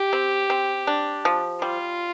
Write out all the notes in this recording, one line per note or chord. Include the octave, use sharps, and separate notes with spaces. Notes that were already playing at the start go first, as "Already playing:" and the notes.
Already playing: G4
C4
C4
D4
F3
G3 F4